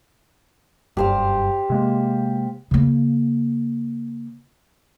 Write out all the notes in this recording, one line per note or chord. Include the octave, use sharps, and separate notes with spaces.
F#1 G2 G4 C5 F5
C3 G#3 A#3
C#3 A#3